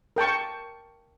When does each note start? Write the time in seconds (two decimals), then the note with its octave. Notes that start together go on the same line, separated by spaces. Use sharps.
0.16 A#4 G5 A5 C#6